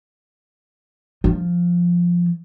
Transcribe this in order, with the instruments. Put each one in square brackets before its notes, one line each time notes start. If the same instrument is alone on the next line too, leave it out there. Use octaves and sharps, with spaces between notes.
[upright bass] F3